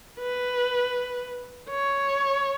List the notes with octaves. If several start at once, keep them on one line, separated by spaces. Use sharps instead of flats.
B4
C#5